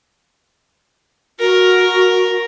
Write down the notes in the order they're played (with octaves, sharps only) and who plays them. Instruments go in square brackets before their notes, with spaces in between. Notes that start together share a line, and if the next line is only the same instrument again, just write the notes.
[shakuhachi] F#4 [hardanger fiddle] A#4